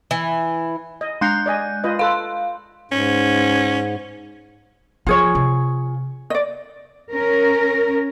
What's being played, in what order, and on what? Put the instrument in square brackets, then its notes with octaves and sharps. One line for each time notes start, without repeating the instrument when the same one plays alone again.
[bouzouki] E3
[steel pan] D#5
[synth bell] G#3 F#6 G6 [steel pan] A#5 C6
[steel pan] D5 D#5 G#5
F4 B4 D#5
[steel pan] A4 B4 [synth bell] F5 C6
[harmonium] G#2 [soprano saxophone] C#4
[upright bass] F3 [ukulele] F4 G#4 C#5
[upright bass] C3
[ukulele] D5 D#5
[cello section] C#4 A#4